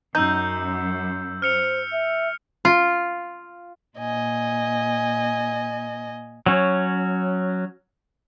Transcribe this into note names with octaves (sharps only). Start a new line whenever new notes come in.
F#2 D#4 E6 G6
C5 F6 C#7 F7
E5
F4
A#2 D#5 G#5
F#3 C#4